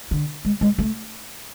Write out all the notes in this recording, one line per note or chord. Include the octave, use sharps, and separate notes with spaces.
D3
G#3
G#3
A3